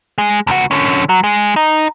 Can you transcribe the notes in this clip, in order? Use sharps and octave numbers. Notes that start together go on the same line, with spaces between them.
G#3
C#2 F#4
D3 C#4
F#3
G#3
D#4